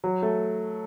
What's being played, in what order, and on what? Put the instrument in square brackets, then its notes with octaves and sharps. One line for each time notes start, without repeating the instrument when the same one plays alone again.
[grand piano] F#3
A3